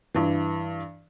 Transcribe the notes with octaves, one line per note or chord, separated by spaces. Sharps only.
G2 E3